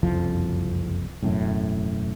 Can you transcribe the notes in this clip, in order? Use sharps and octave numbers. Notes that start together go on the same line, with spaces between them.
F#1 C2 F2 F3
E1 F#2 A2